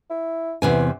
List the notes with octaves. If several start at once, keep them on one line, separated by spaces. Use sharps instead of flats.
E4
E2 C3 E3 G#5